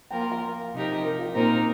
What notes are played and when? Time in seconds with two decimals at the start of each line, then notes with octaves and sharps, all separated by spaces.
0.10 F3 A#3 F4 A#4 G5
0.21 G5
0.31 F5
0.73 C3 F3 D#4 G4 A#4
1.04 A#4
1.19 F4
1.35 A#2 A#3 C4 D#4 A#4